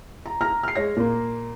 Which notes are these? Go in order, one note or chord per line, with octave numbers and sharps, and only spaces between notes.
A#5
A#5 F6 A#6
F6 C7
G#3 C#5 A#6
A#2 A#3